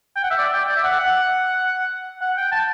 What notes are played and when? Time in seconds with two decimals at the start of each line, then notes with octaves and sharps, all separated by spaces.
0.16 G5
0.24 F#5
0.31 E5
0.39 D5
0.53 G5
0.69 D5
0.76 E5
0.84 F#5
0.99 F#5
2.21 F#5
2.37 G5
2.52 A5